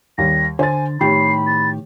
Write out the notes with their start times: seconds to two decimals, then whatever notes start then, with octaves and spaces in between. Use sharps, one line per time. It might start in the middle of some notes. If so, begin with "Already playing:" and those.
0.18 D#2 G3 A#6
0.59 D3 C5 G#5 A6
1.01 A2 D#3 G4 C#5 B5 C7
1.47 A6